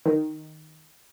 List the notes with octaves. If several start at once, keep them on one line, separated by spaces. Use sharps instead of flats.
D#3